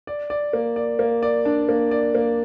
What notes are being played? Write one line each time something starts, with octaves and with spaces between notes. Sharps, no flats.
D5
D5
A#3
D5
A#3
D5
D4
A#3
D5
A#3